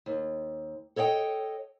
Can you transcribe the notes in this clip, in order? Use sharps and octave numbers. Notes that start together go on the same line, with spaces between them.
D#2
A4 C#5 D#5 F#5 G5